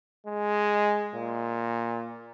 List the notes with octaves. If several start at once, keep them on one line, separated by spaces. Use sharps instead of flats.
G#3
A#2